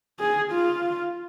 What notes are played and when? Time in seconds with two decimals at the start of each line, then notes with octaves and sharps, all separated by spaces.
0.20 G#4
0.51 F4